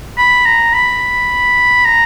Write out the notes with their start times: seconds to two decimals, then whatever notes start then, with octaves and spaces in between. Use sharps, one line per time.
0.18 B5
0.45 A#5
0.74 B5
1.85 A#5